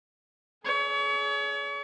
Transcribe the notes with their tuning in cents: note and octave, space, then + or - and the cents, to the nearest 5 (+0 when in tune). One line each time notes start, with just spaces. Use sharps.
G#4 +35 C#5 +35